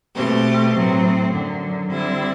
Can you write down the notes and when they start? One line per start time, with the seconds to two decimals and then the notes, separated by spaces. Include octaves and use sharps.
0.14 B2 A3 C4 G4
0.72 A2 F#3 C4
1.30 F#2 D3 F#3
1.88 D3 G3 C4 E4